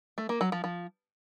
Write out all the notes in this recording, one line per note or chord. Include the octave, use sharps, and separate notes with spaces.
A3
A#3
F#3
F3
F3